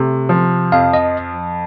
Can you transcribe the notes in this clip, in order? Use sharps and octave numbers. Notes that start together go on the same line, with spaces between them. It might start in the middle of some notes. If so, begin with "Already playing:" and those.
Already playing: C3 A3
F3
F2 F5
D#5